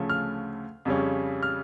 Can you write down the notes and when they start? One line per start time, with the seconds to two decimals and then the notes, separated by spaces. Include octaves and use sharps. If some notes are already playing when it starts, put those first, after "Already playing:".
Already playing: D2 C#3 F3 A3 C#4
0.10 F6
0.85 F2 C#3 G3 C#4
1.43 F6